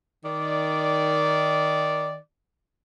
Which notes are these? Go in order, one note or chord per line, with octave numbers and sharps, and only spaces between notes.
D#3 D5